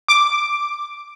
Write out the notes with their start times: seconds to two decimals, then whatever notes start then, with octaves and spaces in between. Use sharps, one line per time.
0.08 D6